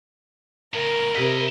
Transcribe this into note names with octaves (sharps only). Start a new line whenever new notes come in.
A2 C#3 A#4
C3 E4 D#5 B6